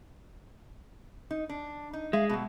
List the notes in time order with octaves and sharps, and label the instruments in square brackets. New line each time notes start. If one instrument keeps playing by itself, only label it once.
[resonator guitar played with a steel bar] D#4
D4
D#4
[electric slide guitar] G#3 [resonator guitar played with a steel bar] E5 F5
[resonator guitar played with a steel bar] B2 F#3